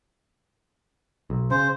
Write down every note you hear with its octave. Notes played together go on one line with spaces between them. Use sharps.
B1
C#3 C5